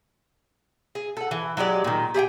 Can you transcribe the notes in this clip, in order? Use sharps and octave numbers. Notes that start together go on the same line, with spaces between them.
G#4
A4 F#5
E3
F#3 G#3 G4 D5
A#2 D#3
G4 G#4 F5 G5